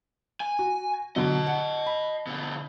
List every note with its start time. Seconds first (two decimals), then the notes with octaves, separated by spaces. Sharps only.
0.40 G#5
0.59 F#4
1.16 B2 D3 F#3 D#5 A5
1.47 F#5
1.86 B5
2.27 B2 D3